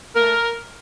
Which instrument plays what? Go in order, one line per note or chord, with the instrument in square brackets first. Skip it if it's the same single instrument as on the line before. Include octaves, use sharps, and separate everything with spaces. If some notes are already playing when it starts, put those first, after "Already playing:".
[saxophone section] A3 A#4